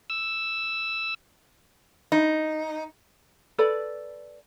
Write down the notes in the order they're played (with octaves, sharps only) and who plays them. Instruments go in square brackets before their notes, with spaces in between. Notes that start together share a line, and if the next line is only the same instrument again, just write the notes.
[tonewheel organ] E6
[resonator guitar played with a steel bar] D#4
[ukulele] A4 B4 D5 B5